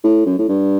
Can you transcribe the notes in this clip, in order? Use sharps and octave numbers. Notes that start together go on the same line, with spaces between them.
A2
F#2
A2
G2